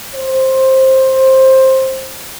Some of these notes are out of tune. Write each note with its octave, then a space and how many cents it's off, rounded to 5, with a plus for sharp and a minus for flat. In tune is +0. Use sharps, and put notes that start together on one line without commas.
C5 +15